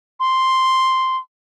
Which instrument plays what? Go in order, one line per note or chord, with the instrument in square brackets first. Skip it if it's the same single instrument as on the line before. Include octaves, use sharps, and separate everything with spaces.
[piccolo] C6